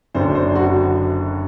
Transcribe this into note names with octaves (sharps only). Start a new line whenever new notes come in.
F#1 F#2 D3 C5
C5
F#4